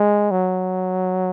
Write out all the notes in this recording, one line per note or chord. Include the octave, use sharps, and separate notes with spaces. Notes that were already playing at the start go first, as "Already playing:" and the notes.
Already playing: G#3
F#3